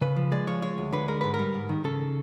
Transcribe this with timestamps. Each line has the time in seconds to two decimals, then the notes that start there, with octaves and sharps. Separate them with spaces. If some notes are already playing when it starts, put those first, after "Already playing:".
0.01 C#3 B4
0.16 F3
0.32 G#3 D5
0.47 F3 C#5
0.62 G#3 C#5
0.78 D2
0.93 D3 B4
1.08 G#3 A#4
1.21 G#2 B4
1.34 A#4
1.39 G3
1.54 G#2
1.69 D#3
1.84 C#3 A4